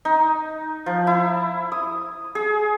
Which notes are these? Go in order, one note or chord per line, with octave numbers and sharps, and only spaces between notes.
D#4
F3
E4
D#6
G#4